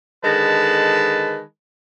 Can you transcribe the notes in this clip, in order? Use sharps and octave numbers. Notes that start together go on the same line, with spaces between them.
D3 D#3 G#3 B4 A5